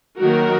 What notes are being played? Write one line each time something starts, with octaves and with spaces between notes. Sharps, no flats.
D#3 F#3 A#3 F#4 A#4